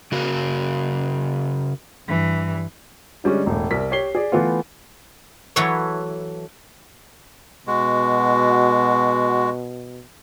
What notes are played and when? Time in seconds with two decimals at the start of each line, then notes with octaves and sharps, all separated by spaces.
0.12 C#3 F#4 A#4
2.08 G2 E3
3.24 D3 G3 G#3 C#4
3.46 E1 A2
3.71 C2 A#4 B6
3.91 G4 C#5 C7 G7
4.15 G#4 D5
4.32 E3 A3 B3 F4
5.56 E3 F#3 A3 B4 C#5
7.67 B2 G#3 F#4